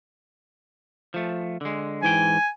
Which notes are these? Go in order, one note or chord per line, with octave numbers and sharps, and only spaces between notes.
F3 A3
D3 G#3
G#2 E3 G5 G#5